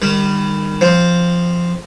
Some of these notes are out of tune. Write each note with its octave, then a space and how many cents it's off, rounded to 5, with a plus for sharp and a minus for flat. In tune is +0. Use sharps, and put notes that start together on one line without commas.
D#3 -25 G3 +20
F3 -5 C4 +0